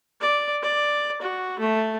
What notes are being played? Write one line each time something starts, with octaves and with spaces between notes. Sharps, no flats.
D5
D5
F#4
A3